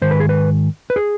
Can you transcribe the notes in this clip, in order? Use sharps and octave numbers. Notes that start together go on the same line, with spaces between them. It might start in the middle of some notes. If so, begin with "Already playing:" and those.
G#2 D#3 C5
B4
G#4
B4
B4
G#4